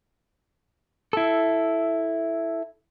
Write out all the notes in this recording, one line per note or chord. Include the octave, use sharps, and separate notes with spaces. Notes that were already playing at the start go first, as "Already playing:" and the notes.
E4 A4